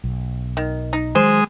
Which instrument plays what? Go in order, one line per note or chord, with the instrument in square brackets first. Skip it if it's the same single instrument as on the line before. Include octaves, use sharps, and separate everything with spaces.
[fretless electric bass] B1
[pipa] D#3
D#4
[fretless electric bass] D#3 F#3 [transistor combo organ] G#3 D#6 [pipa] C5